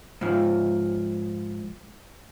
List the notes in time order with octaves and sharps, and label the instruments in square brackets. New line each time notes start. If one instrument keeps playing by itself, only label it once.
[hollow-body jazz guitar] G#2 F3